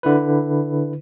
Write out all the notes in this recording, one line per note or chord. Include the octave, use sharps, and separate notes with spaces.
D3 E4 B4